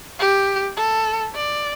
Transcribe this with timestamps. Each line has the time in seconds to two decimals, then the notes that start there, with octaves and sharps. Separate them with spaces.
0.19 G4
0.77 A4
1.35 D5